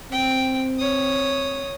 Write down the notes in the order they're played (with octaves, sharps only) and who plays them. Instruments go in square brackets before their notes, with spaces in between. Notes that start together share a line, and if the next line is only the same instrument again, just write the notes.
[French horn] C4 [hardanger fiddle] G5
[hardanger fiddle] C#5 D#6